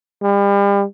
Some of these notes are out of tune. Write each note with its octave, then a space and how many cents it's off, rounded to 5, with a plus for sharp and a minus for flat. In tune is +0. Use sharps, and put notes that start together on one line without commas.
G3 +40